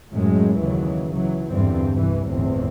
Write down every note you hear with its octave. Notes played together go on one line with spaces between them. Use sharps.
F#2 A2 F#3 G#3
D#2 C#3 E3 F#3
C#2 E3 F#3
E2 G2 D3 E3 C4
C2 G2 E3
G1 E2 A2 C4